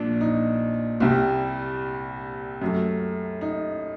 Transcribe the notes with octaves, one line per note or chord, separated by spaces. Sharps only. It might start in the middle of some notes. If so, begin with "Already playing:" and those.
Already playing: A#1 A#2 D4
D#4
C2 C3 G3
F#2 F#3 A3
D#4